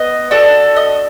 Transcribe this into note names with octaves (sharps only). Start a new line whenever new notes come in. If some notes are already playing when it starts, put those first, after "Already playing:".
Already playing: B3 D#5
D4 F#4 A4
D#5